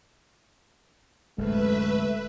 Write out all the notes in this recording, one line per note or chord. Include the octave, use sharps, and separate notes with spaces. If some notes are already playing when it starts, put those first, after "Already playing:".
D1 F#2 C3 G#3 A3 B4 E5